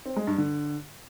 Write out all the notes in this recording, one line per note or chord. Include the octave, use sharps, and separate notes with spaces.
C4
G#3
G2
D3